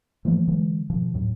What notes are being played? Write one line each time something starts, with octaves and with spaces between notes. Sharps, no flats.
E3 F3 A3 A#3
D3 E3 F#3 G#3
B2 D#3 F3
D#2 A2 F#3